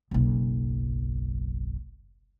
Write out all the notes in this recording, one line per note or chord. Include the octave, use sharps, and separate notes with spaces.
F#1 B1